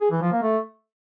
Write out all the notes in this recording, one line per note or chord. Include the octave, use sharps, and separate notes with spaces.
G#4
E3
F3
A#3
A3